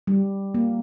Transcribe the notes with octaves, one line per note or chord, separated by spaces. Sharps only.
G3
A#3